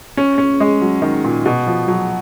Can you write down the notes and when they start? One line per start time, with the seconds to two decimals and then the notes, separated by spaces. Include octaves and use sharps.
0.17 C#4
0.38 C#4
0.60 G#3
0.82 F#3
1.02 D#3
1.24 A#2
1.46 B2
1.67 F3
1.88 F#3